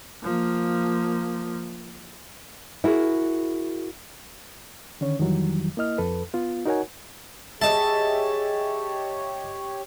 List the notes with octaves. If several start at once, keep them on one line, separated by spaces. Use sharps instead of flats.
F3 A#3
E4 F#4 G#4 A#4
D3 D#3 C#4 C#5
F2 D#3 E3 F#3 G3
A#3 E4 D#5 F6
F2 A4 B4
B3 F4
D#4 F#4 A#4 C#5 F#5 G#5
G4 G#4 C#5 D#5 E5 A5